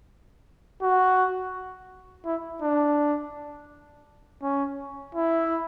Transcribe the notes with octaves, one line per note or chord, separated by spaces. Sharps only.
F#4
E4
D4
C#4
E4